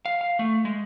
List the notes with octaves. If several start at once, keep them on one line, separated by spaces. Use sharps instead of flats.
F5
F5
A3
G#3